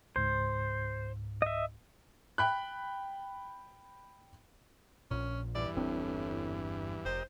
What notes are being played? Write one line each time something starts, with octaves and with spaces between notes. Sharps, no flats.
C#2 G#2 C5
D#5 E5
G5 B5 F#6
A#1 A#2 C#4
E2 G2 E3 D5
G1 A2 C4 D4
F1 G4 A#4 C5 D#5